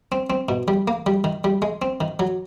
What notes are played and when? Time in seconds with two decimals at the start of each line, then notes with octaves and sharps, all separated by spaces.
0.12 C4
0.30 C4
0.49 B2
0.68 G3
0.88 A#3
1.06 G3
1.24 D#3
1.44 G3
1.62 G#3
1.82 C4
2.01 D#3
2.19 F#3